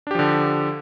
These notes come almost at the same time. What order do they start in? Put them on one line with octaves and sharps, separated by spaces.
D4 G4 F3 D3